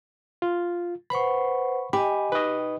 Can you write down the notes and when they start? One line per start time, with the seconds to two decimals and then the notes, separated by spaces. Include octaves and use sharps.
0.42 F4
1.10 B4 C5 F#5 B5 C#6
1.93 G4 D#5 G#5 B5
2.32 D#4 B4 D#5